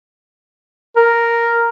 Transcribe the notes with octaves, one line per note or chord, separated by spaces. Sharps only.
A#4